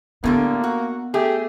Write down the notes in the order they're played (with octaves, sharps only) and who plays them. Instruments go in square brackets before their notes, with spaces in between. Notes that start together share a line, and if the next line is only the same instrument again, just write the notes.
[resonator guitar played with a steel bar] A2 D3 G3 [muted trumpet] A#3 [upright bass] B3
[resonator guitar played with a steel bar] F#4
[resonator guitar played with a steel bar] A3 G#4 [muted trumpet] G4